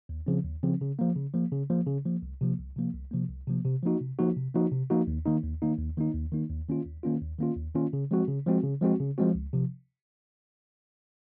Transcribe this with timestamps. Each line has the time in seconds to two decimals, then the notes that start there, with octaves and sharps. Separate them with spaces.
0.09 D#2
0.26 C#3 F3 C4
0.44 D#2
0.63 C#3 F3 C4
0.81 C#3
0.99 F3 A#3
1.16 C#3
1.34 F3 A#3
1.52 C#3
1.70 F3 A#3
1.87 C#3
2.05 F3 A#3
2.22 C2
2.41 C3 F3 A#3
2.59 C2
2.77 C3 F3 A#3
2.94 C2
3.11 C3 F3 A#3
3.30 C2
3.47 C3 F3 A#3
3.65 C3
3.83 F3 A#3 D#4 F#4
4.01 C3
4.19 F3 A#3 D#4 F#4
4.37 C3
4.54 F3 A#3 D#4 F#4
4.72 C3
4.90 F3 A#3 D#4 F#4
5.07 D#2
5.26 D#3 A#3 D#4
5.43 D#2
5.62 D#3 A#3 D#4
5.79 D#2
5.97 D#3 A#3 D#4
6.15 D#2
6.32 D#3 A#3 D#4
6.50 D#2
6.69 D#3 A#3 C#4 F4
6.86 D#2
7.03 D#3 A#3 C#4 F4
7.22 D#2
7.39 D#3 A#3 C#4 F4
7.57 D#2
7.75 D#3 A#3 C#4 F4
7.93 C#3
8.11 F3 G#3 C4 F#4
8.28 C#3
8.47 F3 G#3 C4 F#4
8.63 C#3
8.81 F3 G#3 C4 F#4
9.00 C#3
9.18 F3 G#3 C4 F#4
9.35 C#2
9.53 C3 F3